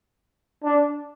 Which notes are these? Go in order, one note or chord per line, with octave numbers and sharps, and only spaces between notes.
D4